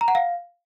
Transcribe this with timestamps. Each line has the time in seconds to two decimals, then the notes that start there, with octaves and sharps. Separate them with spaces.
0.01 A#5
0.08 F#5
0.15 F5